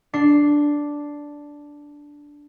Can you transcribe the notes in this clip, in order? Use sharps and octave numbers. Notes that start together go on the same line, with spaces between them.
D4 C7